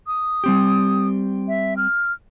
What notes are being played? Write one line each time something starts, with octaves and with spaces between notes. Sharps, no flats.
D#6
G3 C4 G4
E5
F6